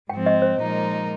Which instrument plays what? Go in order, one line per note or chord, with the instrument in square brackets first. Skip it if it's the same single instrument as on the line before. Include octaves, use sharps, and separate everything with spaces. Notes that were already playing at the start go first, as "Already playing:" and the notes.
[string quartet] G#2 F3 C4 [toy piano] G5
[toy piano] D#5
C5
[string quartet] A#2 F3 G#3 D#4 A#4